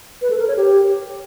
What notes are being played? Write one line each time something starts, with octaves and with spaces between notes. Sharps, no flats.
B4
A4
A#4
C#5
G4